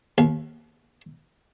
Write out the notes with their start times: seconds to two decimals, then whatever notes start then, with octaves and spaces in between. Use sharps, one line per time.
0.18 D#2